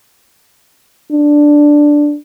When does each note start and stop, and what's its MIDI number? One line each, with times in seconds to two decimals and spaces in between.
1.12 2.16 62